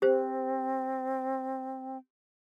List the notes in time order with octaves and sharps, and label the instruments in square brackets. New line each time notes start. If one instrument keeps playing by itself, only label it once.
[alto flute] C4 [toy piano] G4 C5